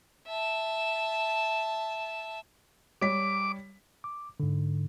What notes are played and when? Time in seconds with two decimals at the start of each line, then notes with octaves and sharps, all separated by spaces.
0.27 E5 A5
3.02 G3 C#5 D6 B6
4.04 D6
4.40 G#2 D3